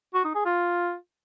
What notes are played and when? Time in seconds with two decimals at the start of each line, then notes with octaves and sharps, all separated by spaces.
0.14 F#4
0.24 D#4
0.35 G#4
0.45 F4